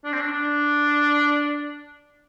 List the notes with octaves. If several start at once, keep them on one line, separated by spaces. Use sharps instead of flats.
D4
C4
D4
D4